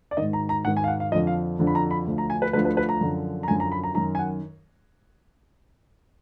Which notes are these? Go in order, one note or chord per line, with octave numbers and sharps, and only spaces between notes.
D5
G#2 D#3 D#5
A#5
A#5
G#2 D#3 F#5
G#5
F5
F#5
F5
F2 D3 F3 D#5
F5
F2 D3 F3
B5
A#5
B5
D2 D3 F3
A#5
G#5
B4
D2 D3 F3 B4
B4
B4
A#5
F#2 D3 F3
A#5
F#2 D3 F3 G#5
A#5
B5
A#5
F#2 D#3 A#5
G#5
F#5